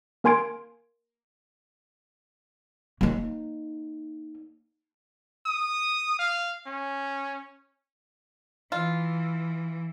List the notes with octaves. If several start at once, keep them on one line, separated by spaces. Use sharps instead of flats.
A#3 A#4 G#5 C6 G#6 D7
A#3 D#4
D#6
F5
C#4
E3 F4